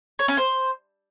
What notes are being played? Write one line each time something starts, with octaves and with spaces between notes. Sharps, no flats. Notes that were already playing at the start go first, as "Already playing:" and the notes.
C#5
C#4
C5